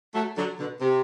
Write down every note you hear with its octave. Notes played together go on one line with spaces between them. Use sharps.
F#3 A3
D3 F#3
B2 D3
C3